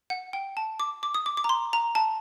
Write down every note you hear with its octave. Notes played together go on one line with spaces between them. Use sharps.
F#5
G5
A5
D6
D6
D#6
D6
D6
A#5
C6
A#5
A5